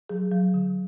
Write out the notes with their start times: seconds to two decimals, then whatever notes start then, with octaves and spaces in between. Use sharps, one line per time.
0.09 F#3 G#4
0.31 F#3
0.54 D3